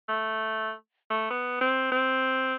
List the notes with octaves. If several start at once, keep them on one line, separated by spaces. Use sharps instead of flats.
A3
A3
B3
C4
C4